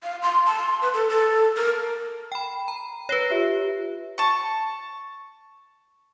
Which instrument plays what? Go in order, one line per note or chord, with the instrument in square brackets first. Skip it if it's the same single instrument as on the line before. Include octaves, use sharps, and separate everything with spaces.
[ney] F5
C6
A5
C6
B4
A4
A4
A#4
[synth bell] G5 B5
A#5
[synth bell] B4 C#5 [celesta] A#6 C7 G7
[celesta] F4 G4 E5
[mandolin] A5 C#6